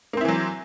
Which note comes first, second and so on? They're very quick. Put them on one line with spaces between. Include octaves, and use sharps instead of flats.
A#3 C4 E4 E3 F#3